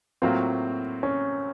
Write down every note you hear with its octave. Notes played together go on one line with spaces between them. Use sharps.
A2 F#3 A#3 C4 F4
C#4